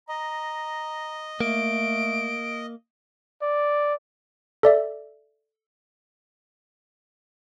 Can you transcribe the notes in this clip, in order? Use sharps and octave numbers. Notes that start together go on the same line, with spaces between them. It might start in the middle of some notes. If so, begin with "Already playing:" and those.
D#5 A#5
A3 A#3 D7
D5
A4 D5 E5